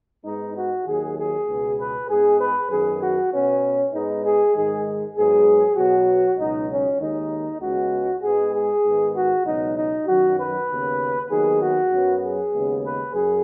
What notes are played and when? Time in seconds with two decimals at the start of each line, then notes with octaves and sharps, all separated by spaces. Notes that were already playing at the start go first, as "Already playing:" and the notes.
0.24 G#2 G#3 B3 D#4
0.55 F#4
0.85 D#2 D#3 F#3 G#4
1.16 G#4
1.46 C#2 B2 B3
1.78 B4
2.08 G#2 G#3 B3 G#4
2.38 B4
2.69 F#2 D#3 B3 G#4
3.00 F#4
3.31 B2 B3 C#4
3.93 G#2 G#3 B3 D#4
4.23 G#4
4.53 G#2 D#3 G#3 G#4
5.15 G#2 F#3 B3 G#4
5.76 B2 F#3 B3 F#4
6.37 C#2 B2 F#3 D#4
6.69 C#4
6.99 D#2 D#3 G#3 D#4
7.60 C#2 C#3 G#3 B3 F#4
8.22 G#2 G#3 B3 G#4
8.53 G#4
8.83 G#2 D#3 B3
9.14 F#4
9.44 C#2 B2 F#3 B3 D#4
9.75 D#4
10.06 F#2 D#3 F#3 F#4
10.37 B4
10.68 D#2 C#3 B3
11.29 D#2 D#3 F#3 B3 G#4
11.59 F#4
11.90 F#2 F#3 B3
12.21 G#4
12.52 D#2 C#3 G#3 B3
12.82 B4
13.13 F#2 G#4